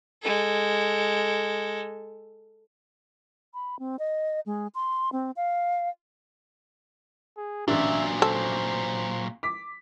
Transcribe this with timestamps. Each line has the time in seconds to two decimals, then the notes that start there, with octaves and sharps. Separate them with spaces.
0.22 G#3 A4
3.54 B5
3.79 C4
3.99 D#5
4.46 G#3
4.75 C6
5.12 C4
5.36 F5
7.37 G#4
7.68 A1 A#2 F#3 D4 E5
8.22 A4 C5
9.43 D6 B6